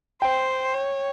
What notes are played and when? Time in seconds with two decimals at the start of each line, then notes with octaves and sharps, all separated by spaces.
0.22 C5 G5
0.74 C#5